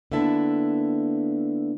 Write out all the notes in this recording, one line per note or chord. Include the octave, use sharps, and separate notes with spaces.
D3 A#3 B3 E4 E5 A5